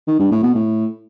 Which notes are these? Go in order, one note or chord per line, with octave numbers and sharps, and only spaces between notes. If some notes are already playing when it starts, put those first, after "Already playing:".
D#3
G2
A2
B2
A2